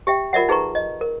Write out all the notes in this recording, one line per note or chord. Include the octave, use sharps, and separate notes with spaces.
G4 E5 G5
F4 A#4 D5 E5 F#5
D#4 G#4 B4 A#5 C#6
D#5
A#4